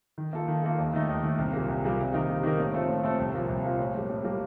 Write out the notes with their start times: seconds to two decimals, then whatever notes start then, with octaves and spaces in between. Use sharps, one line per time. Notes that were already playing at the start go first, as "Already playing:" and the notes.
0.18 D#3
0.33 A#3 F4 A4
0.48 D#3
0.63 A#3 F4 A4
0.78 D#2
0.93 D#3 A3 D#4
1.09 D#2
1.24 D#3 A3 D#4
1.38 C2
1.53 A#2 G3 A#3
1.69 C2
1.84 A#2 G3 A#3
1.99 C3
2.14 D#3 A#3 D#4 A#4
2.29 C3
2.43 D#3 A#3 D#4 A#4
2.59 A2
2.73 A3 C4 F4 A4
2.89 A2
3.04 A3 C4 F4 A4
3.19 C2
3.34 A#2 F3 A#3 F4
3.49 C2
3.64 A#2 F3 A#3 F4
3.79 A2
3.94 G3 A#3
4.09 A2
4.25 G3 A#3